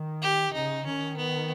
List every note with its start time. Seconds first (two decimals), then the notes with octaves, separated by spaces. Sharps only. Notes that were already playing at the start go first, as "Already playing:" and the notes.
Already playing: D#3
0.22 G4
0.53 C#3 D#4
0.84 D#3 C#4
1.17 B3